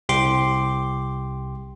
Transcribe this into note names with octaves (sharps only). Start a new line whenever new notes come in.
C2 G4 C6 D6